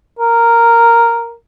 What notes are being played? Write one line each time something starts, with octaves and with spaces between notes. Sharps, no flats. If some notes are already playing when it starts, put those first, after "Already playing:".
A#4